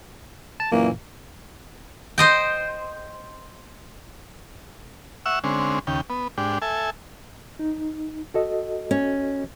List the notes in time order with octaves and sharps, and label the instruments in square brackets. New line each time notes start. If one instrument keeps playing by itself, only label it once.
[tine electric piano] A5
[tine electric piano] F#2 A#2 E3 [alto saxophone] A#3
[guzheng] C5 D#5 G5
[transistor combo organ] E5 F#5 C#6 E6
D3 G#3 C4 C#4
D#2 C#3 G5
B3
G#2 D4 G4
A4 E5 G#5
[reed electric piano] D#4
F#4 A4 D#5
[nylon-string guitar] C#4